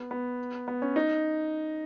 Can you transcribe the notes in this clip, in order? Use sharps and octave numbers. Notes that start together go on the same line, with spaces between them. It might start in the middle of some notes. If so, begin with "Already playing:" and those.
Already playing: B3
B3
B3
C#4
D#4